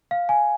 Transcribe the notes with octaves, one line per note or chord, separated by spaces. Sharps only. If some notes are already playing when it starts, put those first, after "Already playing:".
F5
G#5